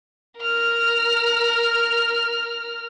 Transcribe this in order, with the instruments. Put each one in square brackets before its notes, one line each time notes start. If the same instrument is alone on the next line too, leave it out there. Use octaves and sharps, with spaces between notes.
[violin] A#4 F6